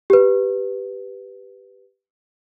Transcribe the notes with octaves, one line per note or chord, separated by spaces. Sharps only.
G4 B4